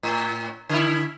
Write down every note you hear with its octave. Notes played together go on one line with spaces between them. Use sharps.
A2
D3 E4